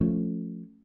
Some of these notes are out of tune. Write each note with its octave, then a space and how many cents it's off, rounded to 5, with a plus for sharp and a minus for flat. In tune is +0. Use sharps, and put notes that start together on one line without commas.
F3 +0 A3 +0 C#4 +0